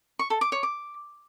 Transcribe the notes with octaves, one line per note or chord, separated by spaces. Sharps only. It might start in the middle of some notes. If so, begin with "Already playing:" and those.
C#6
A4
D6
C#5
D6